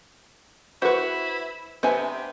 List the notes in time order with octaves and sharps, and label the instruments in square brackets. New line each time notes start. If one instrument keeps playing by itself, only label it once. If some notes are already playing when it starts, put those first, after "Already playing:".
[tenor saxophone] E4 [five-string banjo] F#4 B4 [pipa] C5 C#6
[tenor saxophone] C3 [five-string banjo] B3 D4 E5 [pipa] C5 G#5